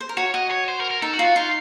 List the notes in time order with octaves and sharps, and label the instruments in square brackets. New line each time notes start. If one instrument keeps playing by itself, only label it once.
[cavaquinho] C5
A#4
[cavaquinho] F#4 [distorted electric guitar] C#5
[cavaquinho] F#4 [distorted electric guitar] D#5
[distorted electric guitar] C#5
C5
A#4
A#4
[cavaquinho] D#4 [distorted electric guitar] A4
[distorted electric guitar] F#4
[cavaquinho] F4
[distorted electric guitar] F#4
[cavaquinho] D#4 [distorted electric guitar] F4